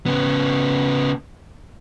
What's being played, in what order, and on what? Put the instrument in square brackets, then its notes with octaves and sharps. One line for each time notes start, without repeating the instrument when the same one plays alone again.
[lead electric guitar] C#3 B3